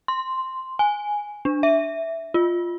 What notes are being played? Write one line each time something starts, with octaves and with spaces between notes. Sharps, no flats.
C6
G#5
D4
E5
F4